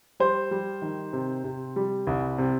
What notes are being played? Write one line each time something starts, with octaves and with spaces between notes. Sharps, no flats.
G3 C5
G3
D#3
C3
C3
G3
C2
C3